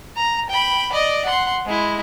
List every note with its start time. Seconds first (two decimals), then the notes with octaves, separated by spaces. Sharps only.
0.16 A#5
0.49 G5 B5
0.92 D5 D#5
1.25 F#5 C6
1.66 G#3 E4